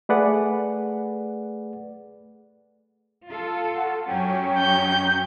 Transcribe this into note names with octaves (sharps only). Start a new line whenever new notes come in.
A3 G#4 B4 D5 F#5
F4 A4
F#5
F#2 F#3 C#4 G5
G6